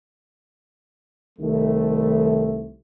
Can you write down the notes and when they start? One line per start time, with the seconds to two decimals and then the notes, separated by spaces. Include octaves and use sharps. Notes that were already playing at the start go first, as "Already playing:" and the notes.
1.39 C2 D#3 A3